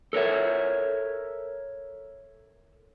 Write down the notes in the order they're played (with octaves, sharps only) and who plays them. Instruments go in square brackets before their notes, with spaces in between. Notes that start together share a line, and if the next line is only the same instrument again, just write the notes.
[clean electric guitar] A4 A#4 C#5 E5